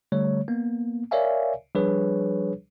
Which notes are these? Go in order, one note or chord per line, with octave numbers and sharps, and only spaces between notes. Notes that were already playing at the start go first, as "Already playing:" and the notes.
D3 G3 A3 C#5
A#3 B3
A#4 C#5 D5 E5 F5 G#5
F3 G3 D4 G#4 B4 C#5